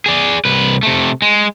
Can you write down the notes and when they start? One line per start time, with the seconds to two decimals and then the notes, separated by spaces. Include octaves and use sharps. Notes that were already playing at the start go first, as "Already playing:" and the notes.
0.06 G#4 D5
0.45 C2 B4
0.83 C3 A3
1.22 G#3